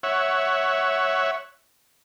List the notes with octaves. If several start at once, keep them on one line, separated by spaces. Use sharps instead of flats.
C#5 E5 F#5